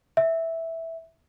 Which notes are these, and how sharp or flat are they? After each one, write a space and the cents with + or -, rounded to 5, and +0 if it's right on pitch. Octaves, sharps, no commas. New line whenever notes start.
E5 -5